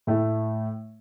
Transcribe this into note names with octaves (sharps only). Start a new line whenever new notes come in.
A2 A3